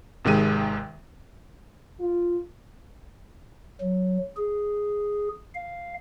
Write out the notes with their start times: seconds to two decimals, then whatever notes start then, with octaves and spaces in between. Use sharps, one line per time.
0.25 G#1 C3 D#3 G#3 D#7
2.00 F4
3.81 F#3
4.37 G#4
5.55 F5